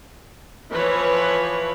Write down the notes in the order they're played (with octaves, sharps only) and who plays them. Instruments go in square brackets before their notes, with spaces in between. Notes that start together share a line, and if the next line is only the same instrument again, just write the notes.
[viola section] E3 F3 B4 C#5